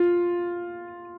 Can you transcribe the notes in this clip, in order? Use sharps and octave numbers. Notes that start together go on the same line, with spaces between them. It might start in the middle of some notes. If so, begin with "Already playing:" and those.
Already playing: F4